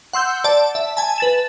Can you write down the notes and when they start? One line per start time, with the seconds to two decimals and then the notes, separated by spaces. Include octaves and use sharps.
0.13 F#5 C6 E6 G6
0.44 D5 A5
0.75 E5
0.97 G#5 A5
1.18 B4 A6 E7